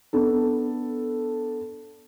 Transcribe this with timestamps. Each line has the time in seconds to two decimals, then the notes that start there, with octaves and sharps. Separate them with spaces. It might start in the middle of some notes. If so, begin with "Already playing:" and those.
0.13 B3 D4 A4